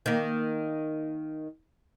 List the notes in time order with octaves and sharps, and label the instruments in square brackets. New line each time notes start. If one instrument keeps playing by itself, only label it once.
[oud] D#3 A#3